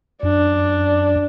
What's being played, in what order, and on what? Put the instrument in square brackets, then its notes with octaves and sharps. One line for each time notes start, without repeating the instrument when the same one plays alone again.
[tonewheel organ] F#2 [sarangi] D4